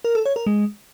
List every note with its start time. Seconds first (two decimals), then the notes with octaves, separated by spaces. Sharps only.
0.04 A#4
0.15 A4
0.25 C#5
0.36 A#4
0.46 G#3